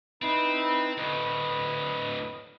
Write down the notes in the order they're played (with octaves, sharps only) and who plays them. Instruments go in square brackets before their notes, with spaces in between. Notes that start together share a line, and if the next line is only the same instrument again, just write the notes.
[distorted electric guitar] C4 [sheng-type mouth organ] D#4 E4 B4
[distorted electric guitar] D2 A2 [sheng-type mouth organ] B4 D#5